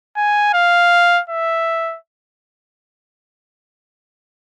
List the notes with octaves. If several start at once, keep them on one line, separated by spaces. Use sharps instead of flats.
G#5
F5
E5